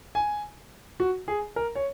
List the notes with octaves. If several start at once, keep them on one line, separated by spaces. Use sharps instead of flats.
G#5
F#4
G#4
A#4
C#5